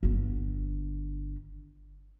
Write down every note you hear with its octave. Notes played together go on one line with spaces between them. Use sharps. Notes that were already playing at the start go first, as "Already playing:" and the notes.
G1 D3